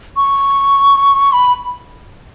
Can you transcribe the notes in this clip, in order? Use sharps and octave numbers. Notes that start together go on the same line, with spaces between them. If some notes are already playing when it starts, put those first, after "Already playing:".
C#6
B5